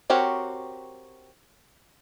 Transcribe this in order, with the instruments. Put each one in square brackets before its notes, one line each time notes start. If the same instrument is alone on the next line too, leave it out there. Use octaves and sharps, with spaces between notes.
[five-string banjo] C4 F#4 G4 A#4 C#5